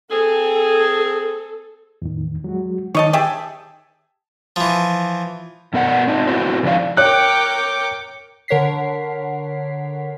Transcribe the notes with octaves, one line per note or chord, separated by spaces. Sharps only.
C4 G#4 A4
E2 A2 D#3
F#3 G#3 F#4
D#3 C#5 D#5 A5
G4 G#4 E5 A5
E3 F3
B2 B3 A#4 D5 F#5
C4 D#4
B3 C4 E4 F#4 C5
C#3 F3 D#4 D5 F5
A#4 C#5 G5 D6 F#6 C#7
D3 A#4 C#5 F#5 B6 C7